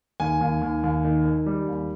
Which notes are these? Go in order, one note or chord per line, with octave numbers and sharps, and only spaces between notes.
D#2 G#5
D#2
D#2
D#2
D#3
D#3
G3
D#2